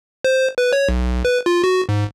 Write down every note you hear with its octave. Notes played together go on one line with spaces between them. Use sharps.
C5
B4
C#5
B1
B4
F4
F#4
G#2